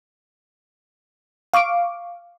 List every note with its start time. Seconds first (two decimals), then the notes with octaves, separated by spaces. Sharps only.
1.54 F5 C#6 D6 D7